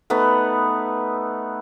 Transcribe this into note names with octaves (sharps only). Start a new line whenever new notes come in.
A3 B3 D#4 B4